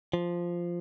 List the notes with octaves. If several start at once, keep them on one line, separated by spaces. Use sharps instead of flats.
F3